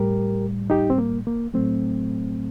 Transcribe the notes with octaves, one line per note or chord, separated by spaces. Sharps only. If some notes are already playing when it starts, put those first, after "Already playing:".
Already playing: A2 G3 G4 A#4
D#4 G4
C4
A#3
A#3
A2 F#3 A3 C4